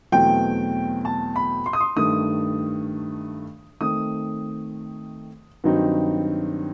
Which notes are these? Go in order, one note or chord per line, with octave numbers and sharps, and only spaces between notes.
E2 B2 F#3 A3 C4 G5
A5
B5
C6
D#6
C6
G2 D#3 A3 D#6
D#3 A3 C4 D#6
G2 D#3 F#3 C4 D#4